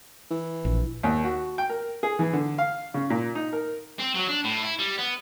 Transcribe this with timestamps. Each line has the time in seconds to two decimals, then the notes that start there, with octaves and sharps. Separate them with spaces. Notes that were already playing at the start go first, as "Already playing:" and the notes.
0.31 E3
0.65 A#1
1.03 D#2
1.24 F#4
1.58 G5
1.70 A#4
2.03 G#4
2.19 E3
2.33 D3
2.58 F5
2.94 C#3
3.10 A#2
3.35 D#4
3.53 A#4
3.99 C4
4.15 F#3
4.28 D4
4.45 A2
4.63 E4
4.79 G3
4.98 B3